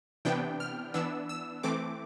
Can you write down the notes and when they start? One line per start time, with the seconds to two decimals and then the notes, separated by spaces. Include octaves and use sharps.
0.25 C3 E3 B3 D4 G5
0.60 F6
0.94 E3 B3 D4 E6
1.29 E6
1.63 E3 A3 C4 D6